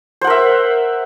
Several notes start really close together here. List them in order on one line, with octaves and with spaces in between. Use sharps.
C5 F#5 A#4 E5